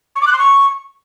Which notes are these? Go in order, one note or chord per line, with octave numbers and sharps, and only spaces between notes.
C#6
D6
F#6
C6
C#6